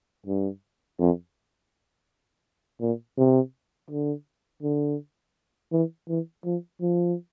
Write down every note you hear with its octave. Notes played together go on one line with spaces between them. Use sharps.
G2
F2
A#2
C3
D3
D3
E3
E3
F3
F3